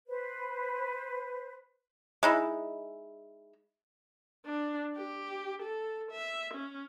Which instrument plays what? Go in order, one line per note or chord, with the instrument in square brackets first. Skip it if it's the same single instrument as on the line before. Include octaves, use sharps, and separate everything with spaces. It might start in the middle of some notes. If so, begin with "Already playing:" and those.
[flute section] B4 C5
[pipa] G#3 D#4 E4
[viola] D4
G4
A4
E5
C#4